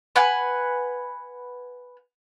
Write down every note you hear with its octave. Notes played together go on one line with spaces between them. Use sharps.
B4 F#5 G#5